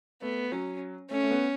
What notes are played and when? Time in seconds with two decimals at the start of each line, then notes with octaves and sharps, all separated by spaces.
0.22 A3 B3
0.52 F#3 C#4
1.10 A3 C#4
1.23 A3
1.31 B3